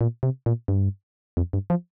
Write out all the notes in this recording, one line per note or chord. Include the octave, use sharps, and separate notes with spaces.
A#2
C3
A#2
G2
F2
G2
F3